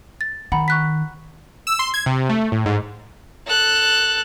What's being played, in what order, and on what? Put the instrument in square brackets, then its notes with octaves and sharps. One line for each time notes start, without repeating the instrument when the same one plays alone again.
[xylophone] A6
[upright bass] D#3 [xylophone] F#5 A#5 B5
[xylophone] C#6 F#6 B6
[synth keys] E6
C6
G#6
C3
A3
A2
G#2
[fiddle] A4 F#6